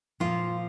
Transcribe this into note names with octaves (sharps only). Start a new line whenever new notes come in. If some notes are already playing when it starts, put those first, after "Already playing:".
A#2 F3 F4